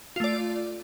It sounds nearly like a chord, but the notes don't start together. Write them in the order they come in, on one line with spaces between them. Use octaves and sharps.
F4 A3 D5